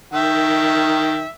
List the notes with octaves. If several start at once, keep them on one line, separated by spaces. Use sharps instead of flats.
D#3 E5 G5